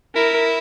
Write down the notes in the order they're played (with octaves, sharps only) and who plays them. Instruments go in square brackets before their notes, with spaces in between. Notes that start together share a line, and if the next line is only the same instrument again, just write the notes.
[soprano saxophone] E4 [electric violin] A#4